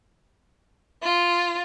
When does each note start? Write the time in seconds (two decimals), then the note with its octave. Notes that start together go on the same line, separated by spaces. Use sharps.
1.02 F4